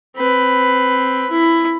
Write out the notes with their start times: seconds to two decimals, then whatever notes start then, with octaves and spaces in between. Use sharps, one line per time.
0.16 C4 B4
1.30 E4